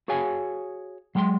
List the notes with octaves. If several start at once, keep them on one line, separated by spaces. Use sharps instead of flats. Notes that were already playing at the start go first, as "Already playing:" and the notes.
F#4 G#4 C#5 F5 G#5
F#3 G#3 G5 B5 C6